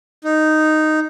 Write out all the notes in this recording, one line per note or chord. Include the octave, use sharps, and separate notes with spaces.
D#4